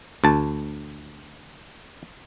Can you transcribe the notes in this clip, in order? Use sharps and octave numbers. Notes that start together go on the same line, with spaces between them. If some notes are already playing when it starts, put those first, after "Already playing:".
D2 A5